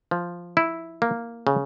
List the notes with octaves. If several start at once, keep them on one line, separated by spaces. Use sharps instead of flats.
F3
E4
A#3
C#3